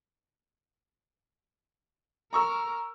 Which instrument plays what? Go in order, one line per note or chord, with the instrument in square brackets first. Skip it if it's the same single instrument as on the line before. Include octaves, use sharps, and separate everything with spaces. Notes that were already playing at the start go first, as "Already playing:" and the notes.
[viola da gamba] A#4 [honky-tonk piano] A#5 C#6 E6